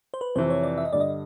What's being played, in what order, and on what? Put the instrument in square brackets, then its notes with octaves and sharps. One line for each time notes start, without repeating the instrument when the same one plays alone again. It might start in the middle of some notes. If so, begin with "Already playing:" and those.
[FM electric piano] C5
B4
[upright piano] F2 C3 E3 [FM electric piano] C5
[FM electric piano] C#5
D5
E5
D#5
[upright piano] G2 D3 G3 [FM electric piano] D5
[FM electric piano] D#5